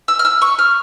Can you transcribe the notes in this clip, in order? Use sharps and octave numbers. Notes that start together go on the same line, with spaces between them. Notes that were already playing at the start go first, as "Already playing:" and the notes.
E6
F6
E6
C#6
F6